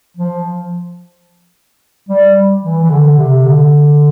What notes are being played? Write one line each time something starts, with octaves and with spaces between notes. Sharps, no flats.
F3
G3
E3
E3
D3
C3
D3